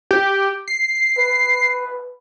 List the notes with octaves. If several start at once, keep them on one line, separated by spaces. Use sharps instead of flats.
G4
C7
B4